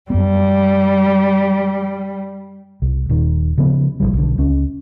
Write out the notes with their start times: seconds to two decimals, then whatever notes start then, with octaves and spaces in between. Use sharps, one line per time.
0.10 F#2 G3 B3
2.82 C2
3.09 D#1 D#3
3.58 C#3 F3 B3
4.00 A#1 F2 F3 G3
4.13 B1 D3
4.38 C#2 C#4